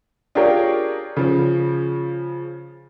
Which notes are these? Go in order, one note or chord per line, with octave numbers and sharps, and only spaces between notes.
D4 F4 G4 G#4 A#4 C#5
C#3 F3